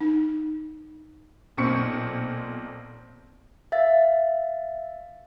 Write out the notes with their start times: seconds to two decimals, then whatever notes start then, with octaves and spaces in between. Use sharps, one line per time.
0.01 D#4
1.57 B1 A#2 C4 C#6 C#7
3.72 E5 F5 A6